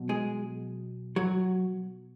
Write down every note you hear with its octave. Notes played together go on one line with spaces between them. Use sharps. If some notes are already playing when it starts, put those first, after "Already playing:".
Already playing: B2 F#3
G#3 G#4
F#3 F#4